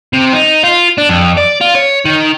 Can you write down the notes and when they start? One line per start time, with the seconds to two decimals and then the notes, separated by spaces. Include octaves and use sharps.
0.13 C3
0.33 D#4
0.64 F4
0.98 D4
1.09 F2
1.37 D5
1.61 F4
1.75 C#5
2.05 D#3